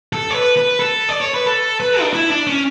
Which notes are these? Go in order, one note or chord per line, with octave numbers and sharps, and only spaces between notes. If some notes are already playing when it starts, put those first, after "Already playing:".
A4
C#5
B4
B4
A4
D5
C#5
B4
A4
B4
D4
E4
D4
C#4